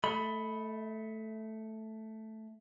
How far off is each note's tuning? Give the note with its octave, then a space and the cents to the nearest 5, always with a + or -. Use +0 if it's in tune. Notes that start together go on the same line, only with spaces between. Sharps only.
A3 +0 D#5 +35 B5 +0